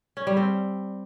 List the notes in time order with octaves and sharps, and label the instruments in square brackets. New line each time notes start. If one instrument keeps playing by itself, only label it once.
[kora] C#4
G3
C4